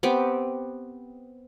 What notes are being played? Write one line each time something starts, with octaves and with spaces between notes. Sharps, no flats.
B3 C4 G4 D6